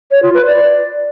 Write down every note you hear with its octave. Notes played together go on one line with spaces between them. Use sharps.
C#5
F4
B4
D5